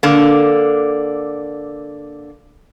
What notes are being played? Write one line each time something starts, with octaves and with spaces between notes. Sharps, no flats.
D3 A#3